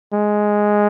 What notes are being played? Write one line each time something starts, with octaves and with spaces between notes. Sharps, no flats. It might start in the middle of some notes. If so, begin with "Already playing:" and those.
G#3